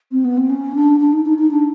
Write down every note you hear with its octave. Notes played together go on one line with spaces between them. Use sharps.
C4
B3
C4
C#4
D4
D4
D#4
D#4
D#4
D4